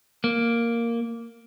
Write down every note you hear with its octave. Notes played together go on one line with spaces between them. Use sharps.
A#3